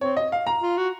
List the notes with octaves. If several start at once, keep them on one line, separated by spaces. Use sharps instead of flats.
C4 C#5
D#5
F5
A#5
F4
F#4